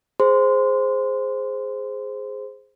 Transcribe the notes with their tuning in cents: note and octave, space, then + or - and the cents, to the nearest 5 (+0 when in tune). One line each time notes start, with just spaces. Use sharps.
G#4 +0 C5 +0 C6 -20